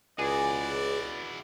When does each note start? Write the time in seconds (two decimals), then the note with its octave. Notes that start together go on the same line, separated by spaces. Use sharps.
0.19 C#2 E4 F#4 G#4 D5